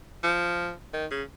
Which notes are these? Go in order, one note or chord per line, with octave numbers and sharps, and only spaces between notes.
F3
D#3
C#3